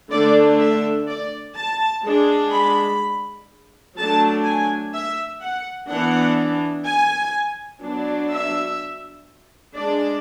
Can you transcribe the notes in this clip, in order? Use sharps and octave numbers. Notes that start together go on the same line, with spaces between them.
D3 A3 D4 D5
E5
D5
A5
G#3 D4
B5
F#3 A3 D4 A5
G#5
E5
F#5
E3 B3 D4 F#5
G#5
F#3 B3 D4
E5
G#3 D4 D5